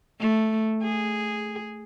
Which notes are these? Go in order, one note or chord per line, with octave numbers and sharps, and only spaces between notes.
A3
G#4